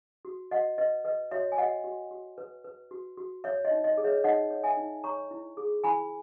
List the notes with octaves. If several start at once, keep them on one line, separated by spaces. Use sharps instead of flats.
F#4
F#4 D#5 F#5
B4 D#5
B4 D#5
F#4 C#5 E5
G#5
F#4 D#5 F#5
F#4
F#4
B4
B4
F#4
F#4
C#5 E5
D#5
D#4
D#5
G#4
C#5 E5
D#4 D#5 F#5
C#5
E5 G#5
D#4
C#5 A#5 C#6
E4
G#4
E4 G#5 B5